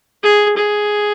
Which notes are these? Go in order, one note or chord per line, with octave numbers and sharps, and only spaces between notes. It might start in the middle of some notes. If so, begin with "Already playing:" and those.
G#4
G#4